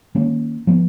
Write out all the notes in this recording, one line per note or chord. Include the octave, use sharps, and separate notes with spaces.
D#3 A#3 C#4
F3 B3